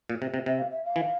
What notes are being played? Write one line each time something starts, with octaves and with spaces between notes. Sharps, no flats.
A#2
C3
C3
C3 E5
F5
E5
F5
E3